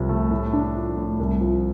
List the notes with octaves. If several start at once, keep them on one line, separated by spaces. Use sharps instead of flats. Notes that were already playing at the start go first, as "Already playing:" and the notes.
Already playing: C2 C3 F3
A3
A2
D4
F3
A2
C2
F3